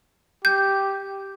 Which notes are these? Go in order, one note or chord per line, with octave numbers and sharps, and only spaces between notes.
G4 G6